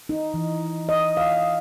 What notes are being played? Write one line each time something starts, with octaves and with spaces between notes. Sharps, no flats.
D#4
E3
D#5
F5